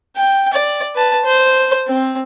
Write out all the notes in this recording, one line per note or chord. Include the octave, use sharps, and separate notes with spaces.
G5
D5
B4 A5
C5
C4